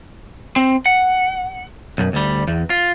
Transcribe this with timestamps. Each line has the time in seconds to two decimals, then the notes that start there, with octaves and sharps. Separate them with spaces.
0.56 C4
0.86 F#5
1.98 B1 F#2
2.13 D2 G3
2.48 E2
2.70 F4